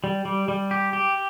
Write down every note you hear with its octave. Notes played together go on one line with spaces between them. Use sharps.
G3
G3
G3
G4
G4